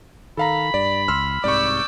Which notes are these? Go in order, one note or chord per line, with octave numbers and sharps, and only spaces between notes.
D#3 A4 F5 A#5 B5
G2 D5
C#2 C6 E6 F6
C2 G#2 C3 D5 C#6 D6 E6 G6